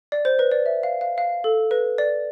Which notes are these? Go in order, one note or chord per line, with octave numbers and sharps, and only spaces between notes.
D5
C5
B4
D5
E5
F5
F5
F5
A4
B4
D5